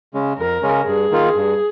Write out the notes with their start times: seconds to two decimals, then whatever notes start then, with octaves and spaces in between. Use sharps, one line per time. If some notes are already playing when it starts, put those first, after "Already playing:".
0.14 C#3 G#3 C#4
0.38 F2 A#4
0.62 C#3 G#3 C#4
0.86 G2 G#4
1.11 D#3 A#3 F4
1.35 G2